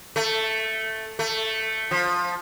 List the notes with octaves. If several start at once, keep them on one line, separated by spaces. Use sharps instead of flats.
A3
A3
F3